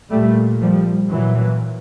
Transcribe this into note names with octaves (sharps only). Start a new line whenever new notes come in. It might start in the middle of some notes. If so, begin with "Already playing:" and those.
A#2 G3 A3
F3 G3
A#2 E3 F#3